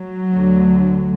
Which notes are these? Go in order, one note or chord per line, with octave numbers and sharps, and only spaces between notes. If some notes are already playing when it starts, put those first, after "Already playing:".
Already playing: F#3
D2 D3